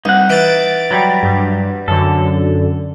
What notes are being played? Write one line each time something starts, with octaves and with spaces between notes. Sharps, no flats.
C2 D#4 F#5
E3 A6 D7
F#3 G3
G2
F#2 D3 A4